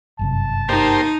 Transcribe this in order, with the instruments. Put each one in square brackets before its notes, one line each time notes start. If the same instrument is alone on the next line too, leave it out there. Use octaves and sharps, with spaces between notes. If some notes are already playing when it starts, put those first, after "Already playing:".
[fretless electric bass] G1 F#2 C3 [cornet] A5
[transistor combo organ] A#3 G4 C5 [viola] D#4